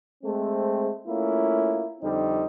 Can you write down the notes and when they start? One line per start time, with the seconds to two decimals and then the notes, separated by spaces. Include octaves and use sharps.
0.24 G#3 A3 C4
1.08 A3 A#3 C#4 E4 F4
2.02 F2 D3 G3 C4 D#4